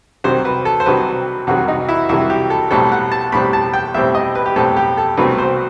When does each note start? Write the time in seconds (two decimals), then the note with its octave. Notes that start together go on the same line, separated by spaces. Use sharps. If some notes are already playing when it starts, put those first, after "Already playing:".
0.24 C2 C3 D#3 F#3 C5
0.45 B4
0.65 A4
0.80 C5
0.86 C2 C3 D#3 F#3 B4
1.47 C2 C3 D#3 F#3 F#4
1.68 D#4
1.89 E4
2.09 C2 C3 D#3 F#3 E4
2.30 G4
2.50 A4
2.71 B1 A2 G3 C4 A4
2.92 F#5
3.12 A5
3.32 B1 A2 G3 C4 B5
3.53 A5
3.74 G5
3.94 B1 A2 G3 C4 E5
4.15 D#5
4.35 B4
4.46 G4
4.56 B1 A2 G3 C4 A4
4.77 G4
4.98 A4
5.17 C2 B2 F#3 A3 C4 B4
5.38 C5